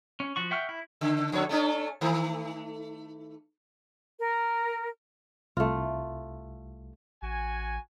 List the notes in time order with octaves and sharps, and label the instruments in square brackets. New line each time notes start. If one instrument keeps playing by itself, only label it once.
[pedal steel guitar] C#4
F3 F#4 C#6
E5 F#5 G5 C#6 F6
E4
[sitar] C#3
F2 D3 C#5
A3 C#4 D4
D#3 A3
[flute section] A#4
[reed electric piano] C2 [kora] A3 F4
[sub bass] A1 [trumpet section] F#4 G#5